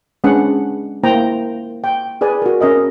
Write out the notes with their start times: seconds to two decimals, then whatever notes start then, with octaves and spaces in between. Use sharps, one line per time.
0.24 G#3 C#4 D4 B4 F#5
1.03 A#3 E4 C5 G5 A#5
1.84 G5
2.21 G#4 B4 D5 G#5
2.42 F#4 A#4
2.61 C#4 A#4 D#5 E5